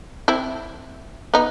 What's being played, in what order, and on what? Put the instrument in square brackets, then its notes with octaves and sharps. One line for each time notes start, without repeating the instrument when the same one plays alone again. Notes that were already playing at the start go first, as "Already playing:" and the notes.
[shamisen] C4 E4
B3 D#4